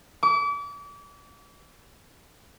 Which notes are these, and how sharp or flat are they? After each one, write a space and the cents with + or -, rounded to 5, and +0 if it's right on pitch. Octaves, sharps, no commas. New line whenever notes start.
D6 -35